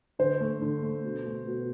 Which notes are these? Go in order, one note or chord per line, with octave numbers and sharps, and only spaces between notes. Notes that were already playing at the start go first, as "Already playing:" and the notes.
D3 C5
A3
D3
A3
B2
A3
B2